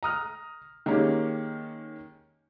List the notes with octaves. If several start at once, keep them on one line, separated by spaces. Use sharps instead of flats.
A#5 D#6 F6
D#3 G#3 A#3 C#4 G4